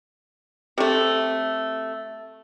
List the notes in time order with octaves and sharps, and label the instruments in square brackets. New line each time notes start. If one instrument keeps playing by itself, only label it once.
[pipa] C3 A3